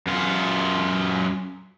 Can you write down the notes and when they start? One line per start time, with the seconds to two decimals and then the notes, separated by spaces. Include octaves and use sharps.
0.07 F#2 F4